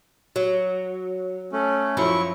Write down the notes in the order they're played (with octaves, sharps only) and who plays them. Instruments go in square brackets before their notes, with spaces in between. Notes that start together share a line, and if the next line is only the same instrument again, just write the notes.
[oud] F#3
[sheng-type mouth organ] A3 C#4
[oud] F#2 F3 F#3 [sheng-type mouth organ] E4 C#6